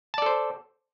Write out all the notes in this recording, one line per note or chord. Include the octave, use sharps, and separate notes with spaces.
A4 C5 D5 A5